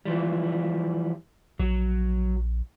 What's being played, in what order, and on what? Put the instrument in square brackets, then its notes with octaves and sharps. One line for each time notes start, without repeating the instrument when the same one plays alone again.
[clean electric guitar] E3 F3 G3
[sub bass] A#1 [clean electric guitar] F#3